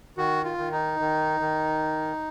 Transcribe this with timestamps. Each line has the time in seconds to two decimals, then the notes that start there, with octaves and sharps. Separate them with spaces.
0.17 D#3 F#4
0.44 F4
0.58 D#3
0.72 D#4
1.00 D#3
1.40 D#3